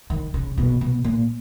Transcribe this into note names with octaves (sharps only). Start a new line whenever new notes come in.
D#3
C#3
B2
B2
A#2